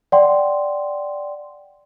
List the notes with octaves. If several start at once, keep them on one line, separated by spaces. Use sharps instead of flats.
D5 F#5 G5 C6